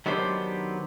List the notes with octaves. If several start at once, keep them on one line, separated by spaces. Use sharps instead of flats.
D#3 F#3 B3 D4 G4 C5